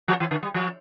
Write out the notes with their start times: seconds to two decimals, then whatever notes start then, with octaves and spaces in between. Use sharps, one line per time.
0.08 F3
0.20 E3
0.31 D3
0.43 G3
0.54 F3